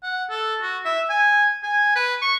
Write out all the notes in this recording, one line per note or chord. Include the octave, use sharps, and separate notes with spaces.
F#5
A4
F#4
E5
G#5
G#5
B4
C#6